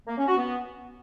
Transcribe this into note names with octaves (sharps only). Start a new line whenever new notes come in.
A#3
C#4
F#4
B3